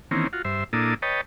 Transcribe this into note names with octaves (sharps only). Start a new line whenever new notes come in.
D#3 E3 A#3 C4 C#4
F4 F#4
G2 C5 E5
A#2 A#3 D4 E4 A4 D#6
B4 C#5 D#5 G5 A5